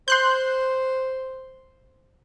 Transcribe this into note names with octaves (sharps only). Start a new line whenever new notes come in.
C5 C6 F#6 G6